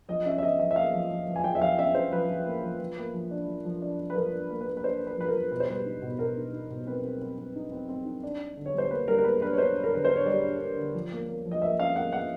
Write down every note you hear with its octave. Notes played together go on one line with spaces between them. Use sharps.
F3 D#5
C#4 E5
E5
F3 D#5
F3 E5
E5
A#3 F5
F3
F3
F3
G#5
F3 G5
E5
F3 F5
C#4 E5
C#4 C5
F3 B4
F3
A#3
F3
F3
A#3
F3
D4
F3
F3
D4
D4
B4
F3 A#4
D4
A#3
B4
A#3
B4
D4 C5
D4
B4
F3 B4
A#4
F3
B2 B4
C5
G3 B4
D#4
B2
B2 A#4
D#4
D#4
B2
C4 B4
C4
C4
C4
D#4
C4
C4
D#4
D4
D4
D3
C#5
G3 C5
A#3 B4
G3 A#4
A#4
A#3 B4
D4 B4
C#5
D4 C5
D4
A#4
D3 B4
C5
D4
C#5
G3 D5
D4
D4
D3
F3
A#3
A#3
F3
D#5
A#3 E5
C#4 F5
A#3 F#5
F3 F#5